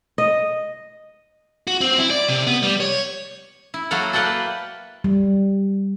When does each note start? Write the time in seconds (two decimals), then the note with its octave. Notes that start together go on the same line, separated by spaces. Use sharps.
0.18 D#5
1.67 F#4
1.81 C4
1.98 E4
2.11 D5
2.29 C3
2.47 B3
2.63 G3
2.80 C#5
3.74 E4
3.91 F#3 A#3 A4 F#5
4.13 A#3 B4 D5 F#5 G5 A5
5.04 G3